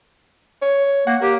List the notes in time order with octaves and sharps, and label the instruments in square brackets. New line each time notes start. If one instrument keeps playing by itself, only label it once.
[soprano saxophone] C#5
[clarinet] A#3 [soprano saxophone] F#5
[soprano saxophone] A#3 [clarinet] G4